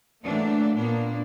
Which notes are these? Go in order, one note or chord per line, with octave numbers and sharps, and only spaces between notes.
E3 F#3 A3 A#3 D4
A#2 A#3 B3 D4